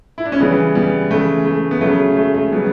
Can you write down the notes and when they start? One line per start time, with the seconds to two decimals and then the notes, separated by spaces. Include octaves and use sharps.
0.18 E4
0.25 D4
0.32 C#4
0.40 C#3 E3 G3 B3
0.75 G3 B3
1.10 C#3 E3 A3
1.46 A3
1.71 B3
1.81 C#3 F#3 A3
2.17 A3
2.34 A3
2.52 C#3 F#3 G3 B3